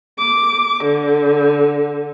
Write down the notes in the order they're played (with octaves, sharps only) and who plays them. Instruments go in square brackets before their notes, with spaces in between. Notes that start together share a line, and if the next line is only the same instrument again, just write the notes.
[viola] D6
D3